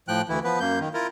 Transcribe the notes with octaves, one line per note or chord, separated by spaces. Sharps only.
A2 F3 G5 F#6
D2 E3 E4
F3 B3 B4
F#2 A#3 G6
D#3
E4 F4 A#4